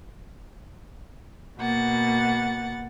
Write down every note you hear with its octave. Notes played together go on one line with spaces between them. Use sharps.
B2 A#3 F#5 A6